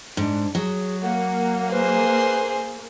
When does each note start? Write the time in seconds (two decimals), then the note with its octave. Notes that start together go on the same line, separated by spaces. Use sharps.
0.17 G#2 D4
0.55 F#3 G#4
1.02 A#3 F#5
1.71 G#4 B4 C5